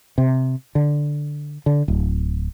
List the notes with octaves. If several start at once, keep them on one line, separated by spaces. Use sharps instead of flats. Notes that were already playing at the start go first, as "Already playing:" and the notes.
C3
D3
D3
D1